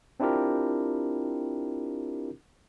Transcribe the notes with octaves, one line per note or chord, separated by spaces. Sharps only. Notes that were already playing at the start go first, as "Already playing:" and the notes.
C4 D4 E4 F4 G4 A#4